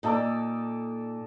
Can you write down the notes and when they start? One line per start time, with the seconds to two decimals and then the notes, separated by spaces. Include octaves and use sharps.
0.03 A#2 D#4 A4 D5